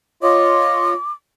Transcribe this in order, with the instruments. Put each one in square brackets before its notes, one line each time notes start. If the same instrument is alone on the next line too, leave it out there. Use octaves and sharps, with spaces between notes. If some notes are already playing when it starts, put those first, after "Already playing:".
[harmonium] F4 C#5 D#5 [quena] D6